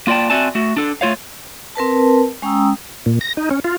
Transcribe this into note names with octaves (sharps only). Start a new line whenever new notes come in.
A#3 F4 D5 G5 A5
C4 F#4 D5 E5 G#5 A5
A3 F#4
D4 A4
A3 F4 C#5 F5
C4 A#4 B4 A5
G#3 C#4 G5 A#5 D#6 E6
A#2
A#6
D#4
C#4
F4